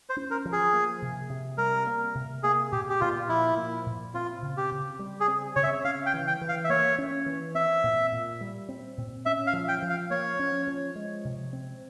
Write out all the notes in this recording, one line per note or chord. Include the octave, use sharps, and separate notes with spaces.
C5
C#4
A#4
F3
G#4
A#3
C3
C3
G3 A#4
A#3
C3
A#3 G#4
A#2 G4
G4
A#2 F4
F3 E4
A#3
A#2
C4 F4
C#3
G4
C#3
G3
G#4
C4
C#3 C#5
E5
C#4 F5
G5
E3
G5
E3
F5
E5
A#3 C#5
C#4
E3
C4 E5
A#2
A#2
G3
C4
A#2
C#4 E5
F5
F3
G5
F3
F5
A#3 C#5
C#4
F3
G#3
C3
C4